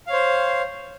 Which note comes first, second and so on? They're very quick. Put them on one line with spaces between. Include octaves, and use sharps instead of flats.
F5 C#5 C5